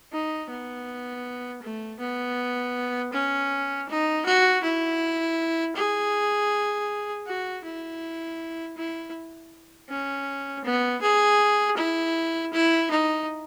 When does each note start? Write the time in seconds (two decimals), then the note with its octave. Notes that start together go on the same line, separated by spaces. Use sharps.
0.13 D#4
0.50 B3
1.62 A3
2.00 B3
3.13 C#4
3.89 D#4
4.26 F#4
4.63 E4
5.76 G#4
7.27 F#4
7.64 E4
8.77 E4
9.90 C#4
10.65 B3
11.02 G#4
11.77 E4
12.53 E4
12.91 D#4